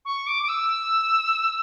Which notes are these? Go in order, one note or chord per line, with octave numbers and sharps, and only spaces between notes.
C#6
D6
D6
E6